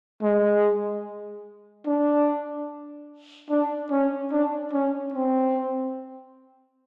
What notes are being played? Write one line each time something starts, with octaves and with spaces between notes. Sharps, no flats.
G#3
D4
D4
C#4
D4
C#4
C4